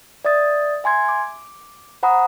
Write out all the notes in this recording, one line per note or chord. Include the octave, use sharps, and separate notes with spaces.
D5 E5 D#6 A6
E5 G#5 C6 G#6
D6
C5 F#5 A#5 B5 D#6